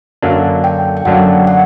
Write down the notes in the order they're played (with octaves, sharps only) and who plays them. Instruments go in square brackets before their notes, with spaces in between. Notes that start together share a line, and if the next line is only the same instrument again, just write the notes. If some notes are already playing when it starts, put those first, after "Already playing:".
[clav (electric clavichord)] F#2 D3 F#3 A#3 D4
[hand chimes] G5
G5
[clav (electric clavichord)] F#2 D3 F#3 A#3 D4 [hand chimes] F#5
[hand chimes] F#5